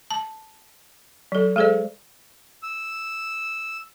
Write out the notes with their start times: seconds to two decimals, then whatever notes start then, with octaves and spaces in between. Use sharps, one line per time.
0.11 A5
1.32 F#3 A4
1.56 G#3 G#4 A4 C5 D5
2.63 E6